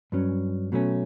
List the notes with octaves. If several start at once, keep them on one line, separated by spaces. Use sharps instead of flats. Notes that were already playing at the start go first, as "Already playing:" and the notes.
G2 F#3 C#4
B2 F#3 A3 C#4